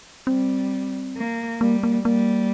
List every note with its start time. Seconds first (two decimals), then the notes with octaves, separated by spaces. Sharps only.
0.27 G3 C4
1.17 A#3
1.61 G3 A#3
1.83 A#3
2.05 G3 A#3